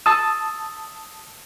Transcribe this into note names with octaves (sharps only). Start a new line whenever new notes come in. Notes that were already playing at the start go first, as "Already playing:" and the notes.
A5 D#6 E6